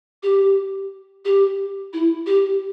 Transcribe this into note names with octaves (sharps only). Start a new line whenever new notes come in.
G4
G4
E4
G4